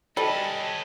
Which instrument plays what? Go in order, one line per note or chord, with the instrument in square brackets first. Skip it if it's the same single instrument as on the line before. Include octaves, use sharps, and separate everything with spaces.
[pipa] G3 [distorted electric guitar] C#4 B4 [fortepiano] A4 [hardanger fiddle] D#5 A5